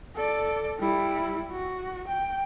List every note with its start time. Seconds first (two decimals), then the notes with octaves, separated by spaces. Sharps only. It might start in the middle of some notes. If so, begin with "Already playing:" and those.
0.16 A4 D5
0.80 G3 E4
1.52 F#4
2.08 G5